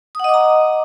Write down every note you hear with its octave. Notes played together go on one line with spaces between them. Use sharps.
D#5 F#5 A#5 D6 D#6